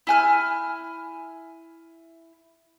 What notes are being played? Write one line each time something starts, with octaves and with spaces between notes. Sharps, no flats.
E4 G#5 F6